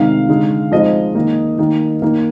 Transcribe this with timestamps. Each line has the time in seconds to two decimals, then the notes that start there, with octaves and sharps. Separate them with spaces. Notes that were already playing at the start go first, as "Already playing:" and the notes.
Already playing: C3 D#3 G#3 D#4 F5
0.29 D3 G#3 D#4
0.72 F3 G#3 C4 D#4 D#5
1.15 D#3 A#3 D#4
1.58 D#3 A#3 D#4
2.02 D#3 A#3 D#4